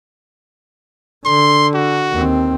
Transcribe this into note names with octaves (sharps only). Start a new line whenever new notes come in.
D3 C6
F#4
D#2 C4